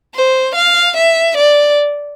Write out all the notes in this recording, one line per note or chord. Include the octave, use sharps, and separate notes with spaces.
C5
F5
E5
D5